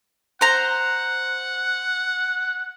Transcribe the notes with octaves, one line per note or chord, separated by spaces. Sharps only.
C5 F#5 A#5